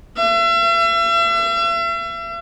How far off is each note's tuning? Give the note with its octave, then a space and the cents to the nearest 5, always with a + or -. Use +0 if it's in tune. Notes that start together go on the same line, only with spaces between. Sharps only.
E5 +40